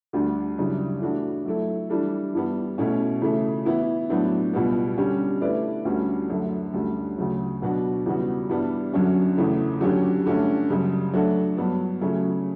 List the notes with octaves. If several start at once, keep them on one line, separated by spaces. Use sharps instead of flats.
D2 D3 G3 D4
F#2 C#3 E3 G3 D4
E3 A3 D4 F#4
F#3 A3 E4 A4
E3 G3 D4 A4
G2 E3 G3 B3
B2 A3 C#4 E4
C#3 E3 A3
E3 B3 E4
A2 F#3 B3 D4
C#2 B2 G3 B3
D3 G3 C#4 G4
D3 A3 E4 B4 D5
D2 D3 G3 C#4 F#4
F#2 D3 A3
D2 D3 G3 C#4
D2 C#3 F#3
B2 F#3 B3 D4 F#4
E2 C#3 G3 B3 F#4
G2 E3 G3 B3 D4
F#2 D3 F#3 C#4
E2 C#3 E3 A3
D3 F#3 C#4 G4
G2 D3 A3 C#4
F#2 C#3 G3
F#3 A3 D4 F#4 A4
G2 F#3 B3
C#3 F#3 A3 C#4